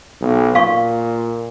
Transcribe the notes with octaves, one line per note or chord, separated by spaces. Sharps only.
B1
A#2 F5 C#6